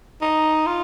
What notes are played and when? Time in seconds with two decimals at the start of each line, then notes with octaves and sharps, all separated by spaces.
0.21 D#4
0.66 F4